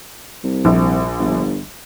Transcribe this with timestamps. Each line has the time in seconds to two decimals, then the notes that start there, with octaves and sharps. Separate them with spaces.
0.44 C2
0.65 A#1
1.19 G1